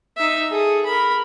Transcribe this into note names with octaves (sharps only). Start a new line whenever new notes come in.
D#4 E5
G#4 A4
A#4 B5